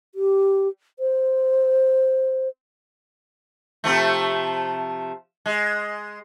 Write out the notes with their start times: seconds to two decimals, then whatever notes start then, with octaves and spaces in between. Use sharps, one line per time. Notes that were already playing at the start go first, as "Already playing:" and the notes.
0.15 G4
0.99 C5
3.84 C3 F3 A3
5.46 G#3